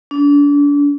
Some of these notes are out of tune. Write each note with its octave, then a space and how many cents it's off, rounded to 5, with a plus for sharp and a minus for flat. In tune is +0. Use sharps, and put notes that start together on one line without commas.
D4 -35